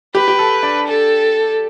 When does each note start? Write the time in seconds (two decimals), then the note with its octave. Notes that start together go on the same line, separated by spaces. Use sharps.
0.15 G4 B4
0.28 G4
0.39 A4
0.63 D4
0.87 A4